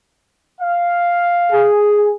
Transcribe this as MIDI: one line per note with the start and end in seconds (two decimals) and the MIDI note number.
0.61 1.67 77
1.51 2.14 68